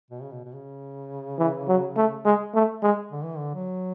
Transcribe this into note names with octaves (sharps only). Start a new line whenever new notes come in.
B2
C#3
B2
B2
C#3
E3
F#3
A3
G#3
A3
G#3
D3
E3
D3
F#3